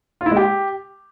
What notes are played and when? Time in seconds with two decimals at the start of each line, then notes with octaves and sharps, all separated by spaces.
0.21 F4
0.26 E4
0.31 G#3
0.37 G4